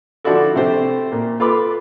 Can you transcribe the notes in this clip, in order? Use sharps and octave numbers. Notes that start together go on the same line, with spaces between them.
D3 F3 D4 E4 F#4 A4
C3 A3 G4 C5
A#2 A#3
F4 A4 B4 B5 D6